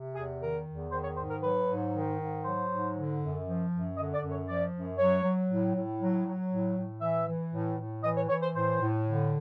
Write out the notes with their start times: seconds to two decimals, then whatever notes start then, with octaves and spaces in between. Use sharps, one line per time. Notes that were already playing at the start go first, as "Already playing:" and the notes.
Already playing: C3
0.15 E2 G#4
0.40 D#3 A#4
0.66 E2
0.91 D#3 C5
1.04 C#5
1.17 G#2 C5
1.30 A#4
1.42 F#3 B4
1.68 G#2
1.93 D#3
2.18 G#2
2.44 F#3 C5
2.69 G#2
2.95 D3
3.20 F#2
3.45 F3
3.71 F#2
3.97 D3 D#5
4.13 D5
4.22 F#2
4.31 C#5
4.47 F3 D5
4.73 F#2
4.98 F#3 C#5
5.24 F#3
5.49 A2
5.74 A2
6.00 F#3
6.26 F#3
6.51 A2
6.76 A2
7.01 E3 E5
7.27 E3
7.52 A2
7.78 A2
8.03 E3 D#5
8.16 C#5
8.29 E3 C#5
8.42 C5
8.55 A2 C5
8.80 A2
9.06 D3